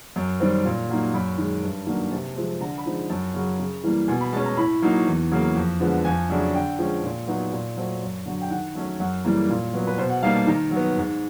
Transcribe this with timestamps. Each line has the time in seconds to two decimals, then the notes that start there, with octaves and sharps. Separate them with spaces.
0.16 F#2
0.40 D#3 G3 C4
0.65 A#2
0.89 F#3 A#3 D#4
1.14 F#2 B5
1.38 D#3 G#3
1.63 G2
1.87 D#3 F#3 A#3 D4
2.12 C3 A5
2.37 F3 G#3 C4
2.60 D3 A#5
2.78 B5
2.86 F3 G#3 C4 D#4
3.10 F#2 A5
3.34 C#3 F#3
3.59 C#3
3.84 E3 G3 A#3
4.08 B2 G#5
4.21 B5
4.33 G#3 C#4 A5
4.45 A#5
4.57 A2 B5
4.82 F#3 A#3 D#4
5.07 E2
5.31 C#3 F#3 A#3
5.56 F2
5.80 D3 F3 G#3 B3
6.05 F2 G#5
6.30 C#3 F#3 A3 D4
6.54 D3 G5
6.79 F3 G#3 C#4
7.04 A#2
7.27 F#3 B3 D#4
7.52 A#2
7.77 F#3 A3 C4
8.01 F#2
8.26 D3 F#3
8.42 G5
8.51 D#3 F#5
8.75 F#3 A3 C#4
9.00 F#2 F#5
9.24 C#3 E3 G3 A#3
9.50 A#2
9.73 F#3 B3
9.87 B4
9.98 B2 C5
10.10 F#5
10.23 G3 A#3 D#4 F5
10.35 A5
10.47 D#3 A#5
10.71 F#3
10.76 B3
10.97 G#2